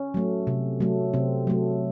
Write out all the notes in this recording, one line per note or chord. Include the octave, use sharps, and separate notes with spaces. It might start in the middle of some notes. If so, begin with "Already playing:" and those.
Already playing: C#4
F#3 A3
C3
F#3 A3
C3 C4
F#3 A3